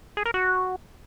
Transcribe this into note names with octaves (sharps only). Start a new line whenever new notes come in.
G#4
A#4
F#4